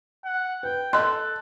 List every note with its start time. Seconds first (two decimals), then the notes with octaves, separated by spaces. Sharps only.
0.25 F#5
0.63 B4 G5
0.93 A4 D#5 C6 F#6